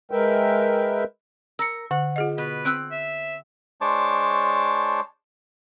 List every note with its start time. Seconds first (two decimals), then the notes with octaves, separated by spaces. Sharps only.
0.11 G#3 A#4 B4 E5 G5
1.59 A#4 E6 A#6 C#7
1.91 D3 F#5
2.16 F4 G#4 D#5
2.38 B2 B4
2.65 C4 E6 F#6 D7
2.91 E5
3.81 G#3 D4 C5 C#5 A5 D6